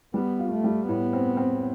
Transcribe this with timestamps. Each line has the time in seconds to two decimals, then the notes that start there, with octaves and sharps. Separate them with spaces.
0.14 G3 B3
0.39 F4
0.51 A3
0.64 G3
0.88 A2 B3
1.13 C4
1.37 C4